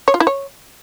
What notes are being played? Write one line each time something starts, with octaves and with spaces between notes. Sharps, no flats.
C#5
F4
E4
C#5